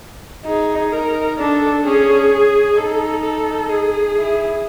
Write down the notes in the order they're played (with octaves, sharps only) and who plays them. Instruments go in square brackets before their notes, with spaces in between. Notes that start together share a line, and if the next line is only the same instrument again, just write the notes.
[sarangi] D#4 [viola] G#4
[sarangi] D#4 [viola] A#4
[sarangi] D4 [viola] A4
[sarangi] C#4 [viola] G#4
[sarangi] D#4 [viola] A4
[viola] A4
G#4
[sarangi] E4